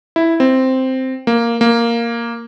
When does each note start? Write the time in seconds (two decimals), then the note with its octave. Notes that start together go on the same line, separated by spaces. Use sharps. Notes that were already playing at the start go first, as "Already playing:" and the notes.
0.16 E4
0.40 C4
1.27 A#3
1.61 A#3